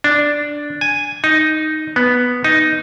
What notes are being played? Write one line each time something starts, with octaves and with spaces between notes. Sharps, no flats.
D4
G#5
D#4
B3
D#4